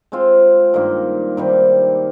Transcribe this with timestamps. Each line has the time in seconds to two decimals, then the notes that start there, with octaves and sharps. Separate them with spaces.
0.12 G#3 C4 F4 C5
0.74 G2 D#3 A#3
1.37 C3 D#3 G3